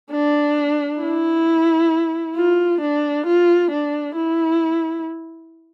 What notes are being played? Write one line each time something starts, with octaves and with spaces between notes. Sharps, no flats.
D4
E4
F4
D4
F4
D4
E4